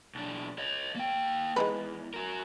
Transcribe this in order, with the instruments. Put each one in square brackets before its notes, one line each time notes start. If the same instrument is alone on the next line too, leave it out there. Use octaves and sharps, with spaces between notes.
[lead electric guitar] B1 D4
C#5 D#5
A#3 G5
[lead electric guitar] E2 [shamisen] G#3 D#4 B4
[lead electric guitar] F#4 A#4